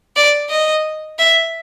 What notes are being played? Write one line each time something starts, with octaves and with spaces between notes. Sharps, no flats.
D5
D#5
E5